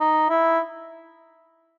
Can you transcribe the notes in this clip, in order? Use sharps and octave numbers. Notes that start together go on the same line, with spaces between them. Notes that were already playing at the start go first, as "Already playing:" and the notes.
D#4
E4